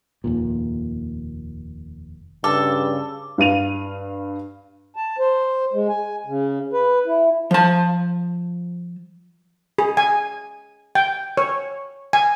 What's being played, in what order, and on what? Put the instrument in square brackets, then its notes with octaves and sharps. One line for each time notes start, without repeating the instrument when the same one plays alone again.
[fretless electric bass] F1 D#2 A#2
[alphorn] G2 [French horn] C#3 [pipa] A4 [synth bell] D6
[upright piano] G2 F5 D#7 F7
[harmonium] A5
C5
G#3
G#5
C#3
B4
E4
[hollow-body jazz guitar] F3 A5
[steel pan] G#4
G#5
G5
C#5
G#5